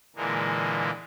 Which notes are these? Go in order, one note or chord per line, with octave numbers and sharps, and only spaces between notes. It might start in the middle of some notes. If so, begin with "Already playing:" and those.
A#2 D3 E3 G#3 A#3